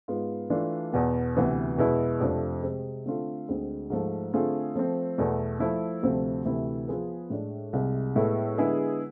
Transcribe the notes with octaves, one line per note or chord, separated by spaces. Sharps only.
G#2 G#3 B3 F4
E3 A3 D4 F4
E2 B2 B3
D2 C3 E3 B3
E2 B2 G#3 B3 E4
F2 C3 F3 A3 D4
C3 G#3 C4
D3 A3 C4 F4 A4
D2 D3 G#3 C4
G#2 F3 A3
D3 A3 C4 F4 G#4
F3 A3 C4
E2 B2 A3 E4
F3 A3 E4
D2 C3 F3 A3 C4
D2 C3 E3 A3 E4
F3 B3 F4 G#4 B4
A2 G#3 D4
C2 C3 G#3
A2 G#3 B3 E4 A4
D3 G#3 B3 E4 G#4